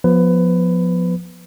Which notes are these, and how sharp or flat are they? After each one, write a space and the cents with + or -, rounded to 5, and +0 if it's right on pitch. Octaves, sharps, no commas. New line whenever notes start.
F3 +20 B3 -15 B4 +20